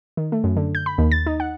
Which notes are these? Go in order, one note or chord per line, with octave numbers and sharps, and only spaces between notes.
D#3
A3
F#2
D3
G6
B5
D#2
A6
D#4
F#5